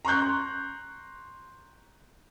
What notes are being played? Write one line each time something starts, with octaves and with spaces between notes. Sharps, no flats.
A#5 C6 C#6 F#6 G6